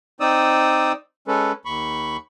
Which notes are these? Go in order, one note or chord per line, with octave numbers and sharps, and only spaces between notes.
C4 D#4 D5 D#6 E6
G#3 C#4 A4 B4
D#2 B5 C#6